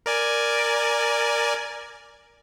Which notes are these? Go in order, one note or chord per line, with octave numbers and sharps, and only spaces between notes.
A#4 D5 G#5